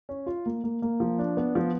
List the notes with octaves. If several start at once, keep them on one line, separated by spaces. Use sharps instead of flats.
C#4
F4
A#3
A#3
A#3
F3
D4
B3
F3